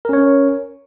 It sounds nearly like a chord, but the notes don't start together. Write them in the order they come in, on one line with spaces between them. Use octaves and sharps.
A#4 C#4 C#5